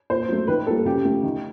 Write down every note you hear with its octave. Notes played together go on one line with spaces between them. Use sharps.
A#2 C5
F#3 A3
D#3 B4
G3 A#3 A4
C#3 G4
F3 A3
D#3